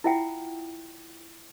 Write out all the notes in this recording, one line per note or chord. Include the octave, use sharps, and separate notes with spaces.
E4 F4 E5 F#5 G5